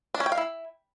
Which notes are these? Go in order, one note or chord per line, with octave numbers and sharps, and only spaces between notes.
D4
C#4
G5
F5
E4